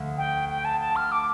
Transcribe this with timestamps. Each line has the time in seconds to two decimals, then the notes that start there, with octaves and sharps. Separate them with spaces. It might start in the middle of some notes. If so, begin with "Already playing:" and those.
Already playing: D2 F3
0.18 G5
0.49 G5
0.65 A5
0.81 A5
0.96 F6
1.12 D6